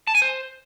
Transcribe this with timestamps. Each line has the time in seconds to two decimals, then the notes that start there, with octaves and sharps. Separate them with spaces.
0.07 A5
0.15 G#5
0.22 C5